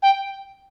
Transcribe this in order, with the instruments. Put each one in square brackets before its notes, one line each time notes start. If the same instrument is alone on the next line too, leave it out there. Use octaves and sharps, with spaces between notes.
[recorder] G5